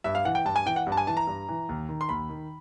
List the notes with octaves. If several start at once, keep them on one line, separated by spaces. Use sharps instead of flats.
G2 E5
F5
E3 F#5
G5
G2 A5
G#5
E3 G5
F#5
G2
A5
G#5
E3 A5
A#5
G2
E3
D#2
D#3
C6
D#2 B5
D#3